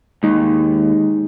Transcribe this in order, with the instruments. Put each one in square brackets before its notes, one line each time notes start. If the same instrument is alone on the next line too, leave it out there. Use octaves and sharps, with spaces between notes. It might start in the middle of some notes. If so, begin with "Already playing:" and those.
[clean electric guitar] D#2 [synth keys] G#3 D#4